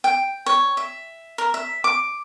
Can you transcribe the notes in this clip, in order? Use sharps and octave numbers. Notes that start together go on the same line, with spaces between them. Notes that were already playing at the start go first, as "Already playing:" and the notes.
G5
C#5
E5
A#4
E5
D6